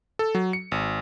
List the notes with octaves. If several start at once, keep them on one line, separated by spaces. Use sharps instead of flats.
A4
F#3
C#7
G#1